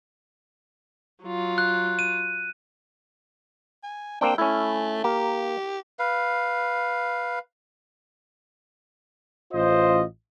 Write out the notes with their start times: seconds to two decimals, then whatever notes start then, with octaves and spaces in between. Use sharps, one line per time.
1.24 F#3 F4
1.58 F#6
1.99 D#7
3.83 G#5
4.21 A#3 C4 D4 G5
4.38 A3 C#4 E4
5.04 A#3 G4
5.99 B4 F5
9.52 A1 F4 C5 D#5